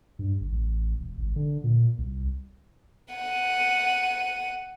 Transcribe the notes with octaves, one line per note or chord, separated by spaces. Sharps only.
G2
G1
A1
E1
G#1
D3
A#2
C2
F#5 D#7